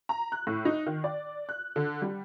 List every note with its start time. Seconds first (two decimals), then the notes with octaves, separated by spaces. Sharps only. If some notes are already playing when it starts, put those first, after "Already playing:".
0.09 A#5
0.32 F#6
0.47 A2
0.65 D#4
0.87 D#3
1.04 D5
1.49 F#6
1.76 D3
2.02 G3